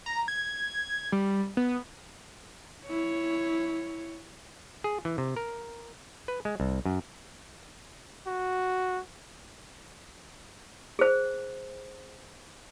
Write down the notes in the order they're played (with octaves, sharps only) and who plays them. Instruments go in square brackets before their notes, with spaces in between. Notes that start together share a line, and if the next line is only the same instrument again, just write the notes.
[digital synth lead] A#5
G#6
G3
B3
[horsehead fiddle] E4 C#5
[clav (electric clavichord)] G#4
E3
C3
A#4
B4
G#3
C2
F#2
[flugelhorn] F#4
[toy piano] G#4 C5